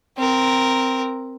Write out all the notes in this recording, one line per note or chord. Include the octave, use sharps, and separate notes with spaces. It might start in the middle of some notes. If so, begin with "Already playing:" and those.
C4 A#4